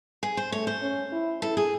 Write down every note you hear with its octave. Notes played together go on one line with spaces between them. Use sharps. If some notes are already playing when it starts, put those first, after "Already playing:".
G#4
C5
A3 C#5
C5
C#4
E4
E4 A4
G#4